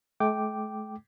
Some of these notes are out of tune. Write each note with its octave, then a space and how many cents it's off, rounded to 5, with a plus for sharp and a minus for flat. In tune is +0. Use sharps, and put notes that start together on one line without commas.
A3 -45 G5 -10 D6 +0